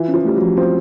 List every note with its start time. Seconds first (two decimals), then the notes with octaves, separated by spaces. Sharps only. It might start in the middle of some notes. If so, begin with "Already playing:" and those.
Already playing: E3 F4
0.08 C#4
0.14 F3
0.25 G3 A3
0.36 F#3
0.42 F3
0.57 C4 F4